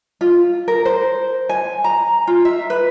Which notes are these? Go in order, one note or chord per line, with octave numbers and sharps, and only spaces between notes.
F4
A#4
C5
G#5
A#5
F4
E5
B4